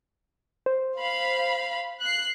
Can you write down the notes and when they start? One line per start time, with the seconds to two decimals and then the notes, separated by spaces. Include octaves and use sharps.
0.66 C5
0.98 F5 B5
2.02 F#6 C7